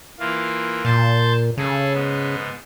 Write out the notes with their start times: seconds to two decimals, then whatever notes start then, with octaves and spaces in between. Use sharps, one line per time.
0.19 E3 A#3 F4
0.85 A#2 A5 C6 G6
1.57 C#3 G#4 A4
1.93 G#2 B3